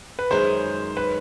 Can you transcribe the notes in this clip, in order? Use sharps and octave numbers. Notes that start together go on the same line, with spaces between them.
B4
F#2 D#3 G#3 C#4 C5
B4